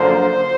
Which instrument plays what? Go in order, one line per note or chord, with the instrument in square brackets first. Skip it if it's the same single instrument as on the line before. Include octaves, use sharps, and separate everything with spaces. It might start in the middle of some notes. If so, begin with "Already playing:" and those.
Already playing: [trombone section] F#2 D3 F3 A#3 C5